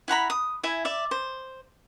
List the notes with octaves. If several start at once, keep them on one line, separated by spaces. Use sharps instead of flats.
E4 F#5 A#5 B5
D#6
E4 E5 G#5
D5 E5
C5